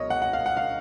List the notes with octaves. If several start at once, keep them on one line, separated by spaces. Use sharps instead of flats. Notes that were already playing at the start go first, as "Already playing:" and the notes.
Already playing: C#2 B2 F#3 A#4 C#5 D#5
F#5
F#5
F5
F#5
F5